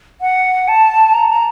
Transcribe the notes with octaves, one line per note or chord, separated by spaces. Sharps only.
F#5
A5
A#5
A#5